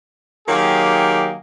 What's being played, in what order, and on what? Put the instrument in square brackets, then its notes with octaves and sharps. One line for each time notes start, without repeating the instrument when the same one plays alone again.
[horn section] D#3 F#3 A#3 G4 G#4